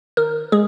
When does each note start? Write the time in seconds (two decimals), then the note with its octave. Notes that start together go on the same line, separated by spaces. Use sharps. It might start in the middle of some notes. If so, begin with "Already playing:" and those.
0.17 D#3 A#4
0.52 G#3 G#4